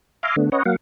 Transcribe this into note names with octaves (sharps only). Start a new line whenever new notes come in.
E5 F5 G#5 A#5 C6 D6
D3 A3 B3 D4
C#4 B4 C#5 D#5 F#5
F#3 A#3 F5 F#5